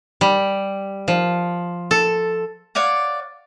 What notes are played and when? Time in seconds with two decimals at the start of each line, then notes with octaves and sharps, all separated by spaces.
0.21 G3
1.08 F3
1.91 A4
2.75 C#5 D5 F5 F#5